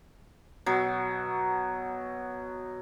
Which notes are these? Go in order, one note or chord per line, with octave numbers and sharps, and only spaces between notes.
B2 F#3